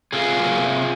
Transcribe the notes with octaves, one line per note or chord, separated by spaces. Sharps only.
C3 F4 G#4
F#3 A#3
C3